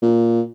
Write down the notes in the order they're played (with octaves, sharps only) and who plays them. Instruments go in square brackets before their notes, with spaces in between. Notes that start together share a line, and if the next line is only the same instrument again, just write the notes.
[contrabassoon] A#2